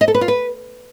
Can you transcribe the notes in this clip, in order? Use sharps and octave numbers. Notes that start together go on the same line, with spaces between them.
D#5
A4
B4
F4
B4